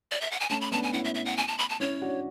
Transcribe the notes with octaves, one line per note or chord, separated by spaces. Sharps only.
D5
E5
F#5
G#5
A3 C#4 A5
B5
B3 D4 A5
G#5
C#4 E4 F#5
E5
E5
F#5
G#5
A5
B5
A5
C#4 E4 C#5
D4 F#4